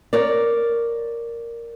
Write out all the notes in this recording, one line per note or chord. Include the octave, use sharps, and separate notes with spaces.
A#4 C#5 D5